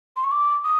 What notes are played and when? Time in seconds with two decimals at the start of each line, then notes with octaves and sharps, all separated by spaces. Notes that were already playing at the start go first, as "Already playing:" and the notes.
0.16 C6
0.24 C#6
0.31 D6
0.64 D#6